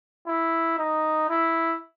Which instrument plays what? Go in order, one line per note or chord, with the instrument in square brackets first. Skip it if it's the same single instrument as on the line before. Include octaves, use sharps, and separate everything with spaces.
[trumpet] E4
D#4
E4